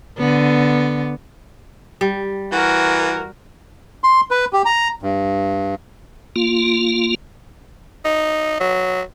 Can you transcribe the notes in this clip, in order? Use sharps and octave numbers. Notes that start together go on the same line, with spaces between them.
D3 B3
G3
E3 F#4 A#4
C6
B4
G4
A#5
G2
A#3 F4
D#4
F#3